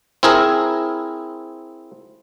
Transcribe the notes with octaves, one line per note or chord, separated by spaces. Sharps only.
C4 E4 G#4 A#4